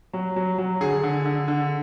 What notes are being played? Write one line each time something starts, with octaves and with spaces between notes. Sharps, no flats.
F#3
F#3
F#3
D3 G#4
D3
D3
D3